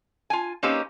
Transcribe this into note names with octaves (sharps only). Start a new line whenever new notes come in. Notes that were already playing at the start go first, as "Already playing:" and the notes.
F4 G#5
A#3 C4 C#4 D#4 G4 B4